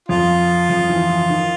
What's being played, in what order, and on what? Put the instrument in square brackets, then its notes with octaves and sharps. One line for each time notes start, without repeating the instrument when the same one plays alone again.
[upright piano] F2 F3 [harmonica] F4
[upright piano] F2 F3
E3
E3
D#3